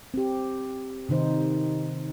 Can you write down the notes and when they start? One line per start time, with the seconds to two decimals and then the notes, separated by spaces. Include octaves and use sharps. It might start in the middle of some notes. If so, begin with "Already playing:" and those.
0.14 C4 G4
1.09 C3 D#3 D#4 C5